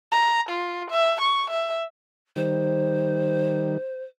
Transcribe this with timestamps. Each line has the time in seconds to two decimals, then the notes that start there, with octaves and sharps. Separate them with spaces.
0.12 A#5
0.50 F4
0.91 E5
1.21 C#6
1.50 E5
2.36 D#3 G3 C5